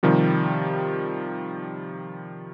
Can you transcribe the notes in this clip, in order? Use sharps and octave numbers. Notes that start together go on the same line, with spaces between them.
C3 D#3 F3 G3